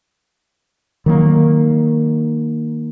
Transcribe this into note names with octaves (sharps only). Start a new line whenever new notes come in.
D#3 F#3 A#3